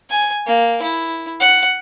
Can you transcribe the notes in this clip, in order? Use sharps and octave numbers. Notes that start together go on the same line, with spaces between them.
G#5
A#3
E4
F#5